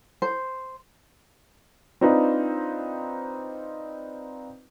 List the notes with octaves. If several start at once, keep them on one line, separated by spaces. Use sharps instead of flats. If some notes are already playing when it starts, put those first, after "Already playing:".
C5
C4 D4 D#4 F4 B4